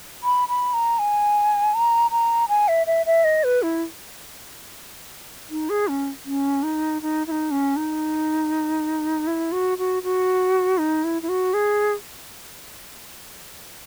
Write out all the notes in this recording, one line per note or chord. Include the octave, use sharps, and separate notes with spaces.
B5
B5
A#5
G#5
A#5
A#5
G#5
E5
E5
E5
D#5
B4
E4
D#4
G#4
C#4
C#4
D#4
D#4
E4
D#4
C#4
D#4
E4
F#4
F#4
F#4
D#4
E4
E4
F#4
G#4